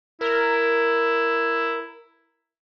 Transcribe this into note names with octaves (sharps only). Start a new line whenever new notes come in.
E4 A#4